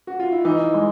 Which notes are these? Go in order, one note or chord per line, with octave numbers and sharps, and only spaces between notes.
F#4
F4
E4
E3 D#4
G#3